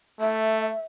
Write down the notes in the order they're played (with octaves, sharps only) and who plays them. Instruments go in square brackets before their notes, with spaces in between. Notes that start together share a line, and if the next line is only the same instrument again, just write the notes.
[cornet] A3 [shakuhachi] E5